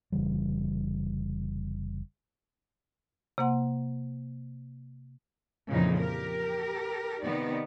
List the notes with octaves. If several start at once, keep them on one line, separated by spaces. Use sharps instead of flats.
F1 C#3 E3 G3
C3 A#3 F#5 C6
F2 A#2 C#3 E3 F3 D#4
G4 A#4
C3 D#3 B3 D#4 D5